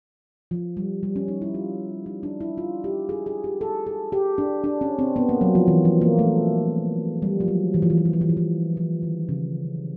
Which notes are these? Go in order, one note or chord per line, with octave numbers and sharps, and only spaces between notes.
F3
G3
G3
C#4
D#4
E4
F4
D#4
D4
E4
F4
G4
G#4
G#4
G4
A4
G#4
G4
D4
D4
C#4
C4
B3
A#3
F#3
F3
E3
F3
A#3
A3
G3
F3
F#3
E3
F3
E3
F3
E3
F3
E3
F3
E3
F3
D#3
C#3